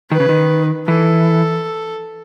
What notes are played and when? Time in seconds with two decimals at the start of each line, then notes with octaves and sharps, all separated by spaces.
0.11 D#3 B4
0.20 C#3
0.29 D#3
0.88 E3 A4